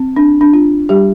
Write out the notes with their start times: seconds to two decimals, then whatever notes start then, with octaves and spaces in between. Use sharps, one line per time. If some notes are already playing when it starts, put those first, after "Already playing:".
Already playing: C4
0.16 D4
0.41 D4
0.53 D4 F4
0.89 G3 G4